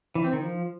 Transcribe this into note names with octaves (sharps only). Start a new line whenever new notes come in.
E3
C4
D#3
F3